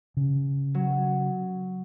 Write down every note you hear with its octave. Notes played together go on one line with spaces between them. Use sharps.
C#3
F#3